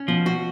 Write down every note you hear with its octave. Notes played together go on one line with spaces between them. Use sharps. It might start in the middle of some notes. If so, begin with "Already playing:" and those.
Already playing: C#4
B2 F3
F#4